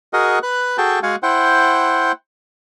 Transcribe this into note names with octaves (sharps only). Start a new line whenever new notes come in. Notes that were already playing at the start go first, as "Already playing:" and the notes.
F#4 G#4 A#4 D#5 F#5
B4 F#6
F#4 G#4 A4 G5 A5
G#3 F#4 F5 F#5 G#5
E4 C5 F#5 G5